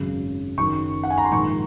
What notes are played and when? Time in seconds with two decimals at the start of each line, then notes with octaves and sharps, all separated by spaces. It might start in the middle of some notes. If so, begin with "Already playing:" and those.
Already playing: G#1 F#2 C#3
0.58 F#1 F#2 D#3 C#6
1.03 F#5
1.10 G#5
1.18 A#5
1.25 C6
1.32 A#1 G#2 D#3 C#6